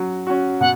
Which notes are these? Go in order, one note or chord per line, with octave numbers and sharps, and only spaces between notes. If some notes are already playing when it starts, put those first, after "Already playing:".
Already playing: F#3 C#4 F#4
C#4 F#4
B2 F#5